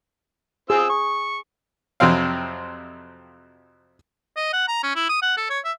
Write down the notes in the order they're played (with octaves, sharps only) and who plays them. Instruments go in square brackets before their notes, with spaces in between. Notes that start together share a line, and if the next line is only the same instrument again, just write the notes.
[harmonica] C4 F4 E6 [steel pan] G#4
[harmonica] C#6
[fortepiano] F2 C3 F#3 C4 F5
[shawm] D#5
F#5
A#5
C#4
E4
D#6
F#5
A4
C#5
E5